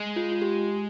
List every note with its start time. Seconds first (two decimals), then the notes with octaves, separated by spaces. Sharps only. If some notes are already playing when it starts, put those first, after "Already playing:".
Already playing: G#3
0.16 F4
0.32 F4
0.42 G4